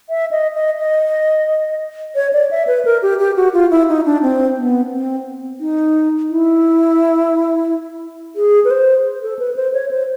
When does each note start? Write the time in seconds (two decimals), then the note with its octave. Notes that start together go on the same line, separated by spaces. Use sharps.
0.10 E5
0.31 D#5
0.55 D#5
0.78 D#5
2.16 C#5
2.33 D5
2.51 E5
2.67 B4
2.85 A#4
3.02 G4
3.19 G4
3.37 F#4
3.53 F4
3.71 E4
3.89 D#4
4.05 D4
4.22 C4
4.57 B3
4.92 C4
5.60 D#4
6.29 E4
8.36 G#4
8.65 B4
8.71 C5
9.22 A4
9.39 B4
9.56 C5
9.74 C#5
9.91 C5